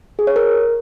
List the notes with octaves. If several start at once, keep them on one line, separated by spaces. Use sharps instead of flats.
G#4
C#5
A#4